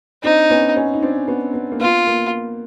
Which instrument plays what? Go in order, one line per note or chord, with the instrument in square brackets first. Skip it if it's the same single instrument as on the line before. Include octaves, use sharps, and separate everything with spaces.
[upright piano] C4 D4 [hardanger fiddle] D#4
[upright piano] B3 C#4
B3 C#4
D#4
C4 D4
B3 C#4
B3
A#3
[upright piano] B3 [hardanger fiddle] F4
[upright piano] A#3